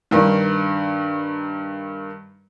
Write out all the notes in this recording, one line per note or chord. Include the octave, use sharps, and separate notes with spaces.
G2 D#3